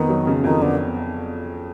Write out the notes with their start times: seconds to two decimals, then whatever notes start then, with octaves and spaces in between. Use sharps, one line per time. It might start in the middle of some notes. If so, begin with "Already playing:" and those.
Already playing: F2 D#3 B3
0.09 F#3
0.27 C#3
0.44 F2 D#3
0.62 D3 B3